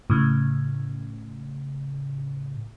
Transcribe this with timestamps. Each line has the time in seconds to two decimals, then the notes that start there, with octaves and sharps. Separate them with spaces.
0.10 A2 C#3